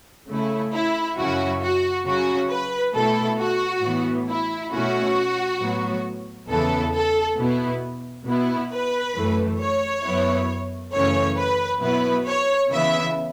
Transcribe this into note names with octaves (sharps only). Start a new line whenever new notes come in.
C#3 A3 E4
E4
F#2 C#3 F#3 C#4 E4 F#4
F#4
C#3 F#3 C#4 F#4
B4
B2 A3 E4 A4
F#4
A2 E3 B3
E4
B2 A3 C#4 E4 F#4
A2 F#3 B3
E2 C#3 E3 B3 E4 A4
A4
B2 B3 E4
B2 B3 E4
B4
F#2 E3 A3
C#5
F#2 F#3 B3 E4
F#2 C#3 E3 A3 C#4 C#5
B4
B2 F#3 B3 E4 B4
C#5
C#3 E3 B3 E4 E5